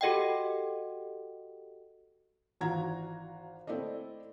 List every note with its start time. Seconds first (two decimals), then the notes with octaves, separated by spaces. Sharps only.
0.01 F#4 G4 A4 D#5 F#5 G5
2.61 G#1 E3 F4 F#4 A#5 G#6
3.67 A3 C4 E4 D5 D#5